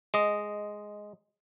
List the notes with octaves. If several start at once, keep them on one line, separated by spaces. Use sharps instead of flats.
G#3 D#5